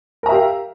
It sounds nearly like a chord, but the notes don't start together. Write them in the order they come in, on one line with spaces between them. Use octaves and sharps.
A#4 A#5 E5 G4 F5